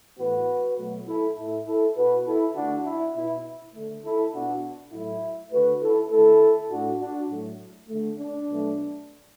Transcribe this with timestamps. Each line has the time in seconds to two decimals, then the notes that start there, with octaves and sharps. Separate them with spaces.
0.18 A2 E3 B3 F#4 B4
0.78 B2 F#3 A3
1.07 E4 A4
1.37 A2 A3 E4
1.66 E4 A4
1.96 B2 B3 F#4 B4
2.25 E4 A4
2.55 D3 A3 D4 F#4
2.85 E4
3.14 B2 B3 E4
3.74 D3 A3
4.04 E4 A4
4.33 B2 B3 D4 F#4
4.92 A2 F#3 A3 E4
5.51 D3 A3 F#4 B4
5.81 E4 A4
6.11 D3 A3 E4 A4
6.70 A2 A3 D4 F#4
7.00 D4 F#4
7.29 A2 F#3 A3
7.89 D3 A3
8.19 D4
8.48 B2 F#3 A3